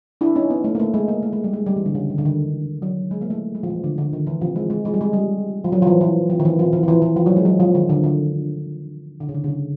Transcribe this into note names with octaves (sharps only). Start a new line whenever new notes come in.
D4 E4
C#4 D#4
B3
A3
A#3
A3
G#3
A#3
A3
G#3
G3
G#3
G3
E3
D3
C#3
D#3
D3
D#3
F#3
G#3
A#3
A3
G#3
F3
E3
D3
D3
D#3
E3
F3
G#3
G#3
G#3
G3
G#3
G3
F3
F#3
F3
E3
E3
F3
D#3
E3
F3
E3
F3
E3
E3
F3
F#3
G#3
F#3
F3
D#3
D3
D3
D3
C#3
D3
C#3
D3